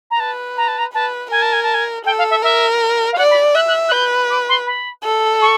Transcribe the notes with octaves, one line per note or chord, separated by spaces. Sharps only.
A#5
B4 A5
A#5
A5
A#5
B4 A5
A#4 G#5
A5
G#5
A5
G#5
A4 G5
F5
E5
A#4 E5
F5
D5 F#5
B5
E5 F#6
F#6
F#6
B4 G6
D6
C6
B5
A4
C#6